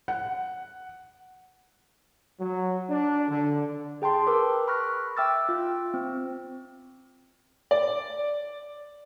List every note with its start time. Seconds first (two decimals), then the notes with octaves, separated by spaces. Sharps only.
0.08 F#5
2.39 F#3
2.89 D4
3.28 D3
4.02 G#4 G5 A5 C6
4.27 A#4 B4 D6 E6
4.68 B5 C#6 F6 F#6 A#6
5.17 E5 G5 D6 E6 F6 A6
5.49 F4
5.94 C4
7.71 D5